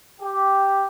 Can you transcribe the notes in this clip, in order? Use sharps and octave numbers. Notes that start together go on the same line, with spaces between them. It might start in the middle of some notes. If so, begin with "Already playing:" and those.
G4